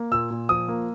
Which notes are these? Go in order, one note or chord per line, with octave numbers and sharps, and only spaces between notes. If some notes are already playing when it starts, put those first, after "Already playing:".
Already playing: A#3
A#2 E6
A#2
F3 D#6
A#3